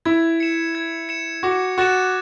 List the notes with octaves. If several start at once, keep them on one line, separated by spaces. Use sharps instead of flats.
E4 G#6
C#7 E7
G#6
C#7 E7
F#4 D6
F#4 F#6 A6 E7